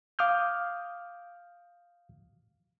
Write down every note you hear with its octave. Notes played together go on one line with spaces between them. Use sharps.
F5 D6 D#6 F6 G6